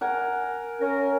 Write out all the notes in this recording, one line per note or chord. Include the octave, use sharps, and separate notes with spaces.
A#4 F#5 G#5
C#4 A#4